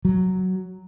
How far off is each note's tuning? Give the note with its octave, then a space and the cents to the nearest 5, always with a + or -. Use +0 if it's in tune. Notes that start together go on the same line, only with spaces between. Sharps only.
F#3 +5